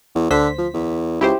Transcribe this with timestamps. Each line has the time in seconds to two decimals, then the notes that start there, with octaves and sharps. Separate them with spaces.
0.15 E2
0.30 D2 D3 C5 B6
0.58 F3
0.74 E2
1.21 C#2 E4 G4 C5